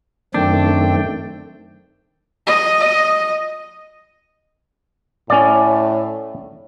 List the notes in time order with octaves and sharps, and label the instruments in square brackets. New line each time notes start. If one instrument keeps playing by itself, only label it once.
[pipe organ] F#2 C4 G5 [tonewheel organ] D#3 A3 [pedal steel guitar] D4
[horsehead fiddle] D#5
[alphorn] A2 [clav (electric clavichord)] C#4 D5